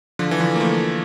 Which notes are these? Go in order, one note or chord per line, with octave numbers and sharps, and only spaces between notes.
D3 F3
E3
D3 F3
A#3
F3 A3